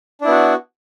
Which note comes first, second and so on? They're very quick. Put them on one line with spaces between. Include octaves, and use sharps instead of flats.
D4 E4 B3 F#4